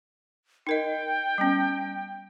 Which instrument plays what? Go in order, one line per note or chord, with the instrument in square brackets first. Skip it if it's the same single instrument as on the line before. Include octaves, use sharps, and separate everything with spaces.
[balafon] D#4 A#4 D#5 [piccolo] G5
[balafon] G3 B3 C#4